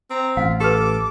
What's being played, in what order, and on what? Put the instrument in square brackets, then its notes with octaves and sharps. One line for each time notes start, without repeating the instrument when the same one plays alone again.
[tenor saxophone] C4 [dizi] A#5
[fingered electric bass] A1 [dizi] F4 [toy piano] F5
[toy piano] G4 B4 [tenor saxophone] A4 [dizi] D6